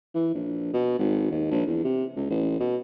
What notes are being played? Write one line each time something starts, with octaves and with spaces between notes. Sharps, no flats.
E3
A#1
B2
G#1
D#2
A#1
E2
C3
C#2
A1
B2